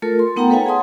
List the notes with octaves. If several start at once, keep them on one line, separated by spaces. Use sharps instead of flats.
A3 F4 A4 A#4
C6
A3 B3 D#4 F#5 G5 A#5
A4 B4 C#5 F5 F#5 G#5
G#4 F#5 A5 C6 D#6